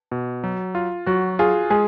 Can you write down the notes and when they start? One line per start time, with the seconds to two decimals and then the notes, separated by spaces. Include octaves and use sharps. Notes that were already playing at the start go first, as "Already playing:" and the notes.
0.12 B2
0.44 F#3
0.75 F4
1.06 F#3 F#4
1.39 F4 G#4
1.70 G#3 G#4